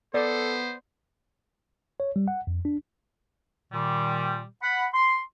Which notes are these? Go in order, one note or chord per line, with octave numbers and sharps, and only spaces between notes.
B3 A4 C5 D5
C#5
G3
F#5
F2
D4
A#2 D#3 G3
F#5 B5
C6